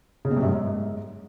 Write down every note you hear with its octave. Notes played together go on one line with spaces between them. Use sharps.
C#3
B2
G2
F#2
G#2